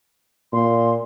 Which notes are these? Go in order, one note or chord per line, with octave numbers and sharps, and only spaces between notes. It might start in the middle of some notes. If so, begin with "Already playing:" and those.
A#2 C6